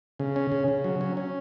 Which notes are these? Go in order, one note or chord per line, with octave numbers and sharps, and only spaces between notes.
C#3
C#4
C#3
C#3
F#3
C#4
C#4